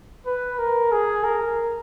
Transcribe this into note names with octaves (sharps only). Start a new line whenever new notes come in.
B4
A#4
G#4
A#4